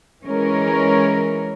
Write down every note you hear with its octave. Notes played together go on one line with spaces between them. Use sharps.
E3 G#3 C#4 A#4 C#5